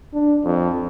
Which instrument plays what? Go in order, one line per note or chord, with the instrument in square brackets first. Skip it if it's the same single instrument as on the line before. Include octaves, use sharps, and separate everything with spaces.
[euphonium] D4
F2